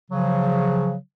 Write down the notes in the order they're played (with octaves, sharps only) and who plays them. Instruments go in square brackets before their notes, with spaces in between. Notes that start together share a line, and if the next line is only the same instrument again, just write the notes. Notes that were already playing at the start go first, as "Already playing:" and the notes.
[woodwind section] C#3 F3 F#3